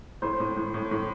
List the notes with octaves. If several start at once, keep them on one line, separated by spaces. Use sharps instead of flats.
A2 C5
A2
A2
A2
A2